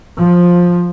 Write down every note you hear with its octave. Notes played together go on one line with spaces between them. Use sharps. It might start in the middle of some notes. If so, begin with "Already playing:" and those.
F3